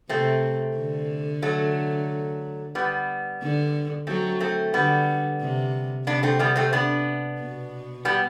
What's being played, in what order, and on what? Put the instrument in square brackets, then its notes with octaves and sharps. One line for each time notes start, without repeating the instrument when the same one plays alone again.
[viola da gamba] C3 [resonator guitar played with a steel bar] A3 C4
[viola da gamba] D3
[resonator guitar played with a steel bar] F#3 A3
G3 B3
[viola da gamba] D3
[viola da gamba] F#3 [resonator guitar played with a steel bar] A3 C4
[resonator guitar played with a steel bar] A3 C4
[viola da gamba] D3 [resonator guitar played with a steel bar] G3 B3
[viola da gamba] C3
[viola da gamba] C3 [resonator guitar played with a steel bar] B3 D4
[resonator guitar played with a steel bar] A3 C4
G3 B3
A3 C4
B3 D4
[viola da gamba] B2
[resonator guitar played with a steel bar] G3 B3